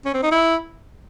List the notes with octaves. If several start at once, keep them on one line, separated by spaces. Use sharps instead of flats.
C#4
C4
D#4
E4